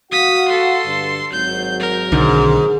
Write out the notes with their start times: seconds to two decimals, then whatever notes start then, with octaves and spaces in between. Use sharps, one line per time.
0.11 F#4 F5 F#5 D#6 B6
0.48 A4 C6
0.85 G2 D3
1.32 G#1 F#3 G6
1.80 A#4
2.12 B1 G#2 D3 D#3